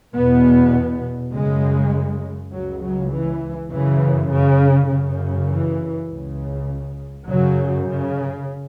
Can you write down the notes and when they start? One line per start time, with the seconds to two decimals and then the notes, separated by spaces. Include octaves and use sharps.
0.14 E2 B2 B3
1.33 F#2 C#3 G#3
2.52 C#2 C#3 F#3
2.82 F#3
3.11 E3
3.70 F#2 C#3 E3
4.30 C#3
4.90 F#2 C#3
5.49 E3
6.09 C#2 C#3
7.27 F#2 C#3 F#3
7.88 C#3